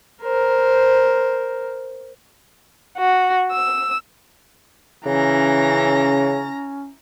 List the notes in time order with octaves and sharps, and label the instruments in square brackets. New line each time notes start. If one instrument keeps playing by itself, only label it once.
[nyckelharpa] A#4 C5
[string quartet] F#4
E6
[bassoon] C#3 [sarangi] E3 [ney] C#4 [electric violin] A#5 A#6